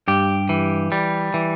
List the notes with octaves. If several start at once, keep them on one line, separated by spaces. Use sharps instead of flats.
G2 G4
E3
G3
E3